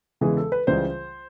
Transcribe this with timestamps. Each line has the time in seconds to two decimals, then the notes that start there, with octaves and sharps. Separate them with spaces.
0.21 E2 C#3 E3 G#3 G#4
0.37 A4
0.52 B4
0.67 C#2 C#3 E3 G3 C5